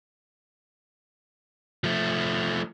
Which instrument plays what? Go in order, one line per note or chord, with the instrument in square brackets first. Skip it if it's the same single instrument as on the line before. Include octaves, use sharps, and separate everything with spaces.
[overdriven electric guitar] F3 A3